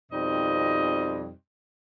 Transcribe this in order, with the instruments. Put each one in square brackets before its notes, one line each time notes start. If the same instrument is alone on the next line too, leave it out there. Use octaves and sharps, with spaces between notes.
[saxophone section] F2 B2 G3 C4 D#4 D#5